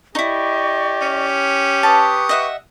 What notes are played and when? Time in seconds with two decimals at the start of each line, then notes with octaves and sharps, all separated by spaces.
0.15 D#4 E4 G4 D5 D#5 C#6
1.02 C#4
1.83 B4 A5 C#6 D#6
2.29 D#5 E5 F#5